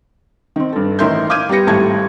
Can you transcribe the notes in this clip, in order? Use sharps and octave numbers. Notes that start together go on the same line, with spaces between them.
D#3 C4
G2 A4
A1 D#3 A#4 E5 C6 G6
F5 D6 F6 G6 G#6 D#7
G3 B3 G4 A#6 C#7
G#1 A2 G3 A5 C#6 G#6